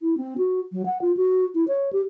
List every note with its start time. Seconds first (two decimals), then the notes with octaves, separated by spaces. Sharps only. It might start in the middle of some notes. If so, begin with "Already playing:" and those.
0.01 E4
0.17 C4
0.38 F#4
0.72 F#3
0.86 F#5
1.01 F4
1.17 F#4
1.55 E4
1.68 C#5
1.93 G4